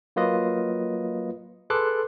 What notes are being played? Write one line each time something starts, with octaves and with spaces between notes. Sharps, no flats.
F#3 A#3 F4 B4 D#5
G#4 A4 B4 C6 D6 F#6